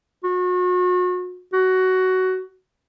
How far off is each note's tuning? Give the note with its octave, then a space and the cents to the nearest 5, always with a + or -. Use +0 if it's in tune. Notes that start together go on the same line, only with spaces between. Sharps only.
F#4 -35
F#4 +15